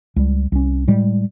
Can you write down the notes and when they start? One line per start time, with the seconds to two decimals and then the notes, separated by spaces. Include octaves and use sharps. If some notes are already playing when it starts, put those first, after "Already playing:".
0.16 C#2 G3
0.52 C2 C#4
0.88 A2 G3 G#3